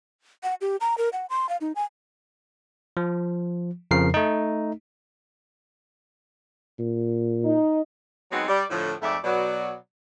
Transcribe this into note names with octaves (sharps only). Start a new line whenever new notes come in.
F#5
G4
A#5
A#4
F#5
C6
F5
D#4
G#5
F3
F2 C#3 F3 A#4 C7
A3 D#4
A#2
D#4
F#3 G#3 B3 C4 D#4 F#4
G3 D5
A2 D3 F3
F2 G#2 A3 D5 E5
B2 F#3 D5